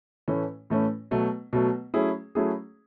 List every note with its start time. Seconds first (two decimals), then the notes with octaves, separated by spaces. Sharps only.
0.28 A2 E3 A3 C#4
0.70 A2 E3 A3 C#4
1.11 B2 F#3 A3
1.53 B2 F#3 A3
1.94 F#3 A3 C#4 E4 G#4
2.35 F#3 A3 C#4 E4 G#4